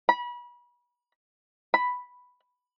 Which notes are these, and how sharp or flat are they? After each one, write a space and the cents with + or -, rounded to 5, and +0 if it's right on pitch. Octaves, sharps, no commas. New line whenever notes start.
B5 -30
B5 +0